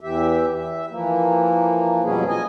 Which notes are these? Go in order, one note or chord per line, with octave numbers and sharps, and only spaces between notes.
E2 E3 G4 E5
E5
E3 F3 A#3
F2 B2 F#3 G3 C#4 G#4
D#5 G#5